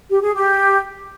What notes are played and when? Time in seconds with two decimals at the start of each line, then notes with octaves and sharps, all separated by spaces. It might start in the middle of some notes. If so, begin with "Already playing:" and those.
0.09 G4
0.21 G#4
0.33 G4